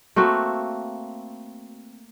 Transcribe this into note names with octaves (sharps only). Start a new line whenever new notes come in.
A3 A#3 C4 F#4